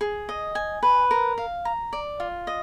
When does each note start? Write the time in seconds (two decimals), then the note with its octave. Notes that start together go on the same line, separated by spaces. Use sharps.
0.01 G#4
0.29 D#5
0.55 G#5
0.83 B4
1.11 A#4
1.38 F5
1.65 A#5
1.93 D5
2.20 F4
2.47 D#5